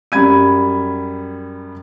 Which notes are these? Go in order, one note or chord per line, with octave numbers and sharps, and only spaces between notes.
F#2 G3 B5 G#6 D#7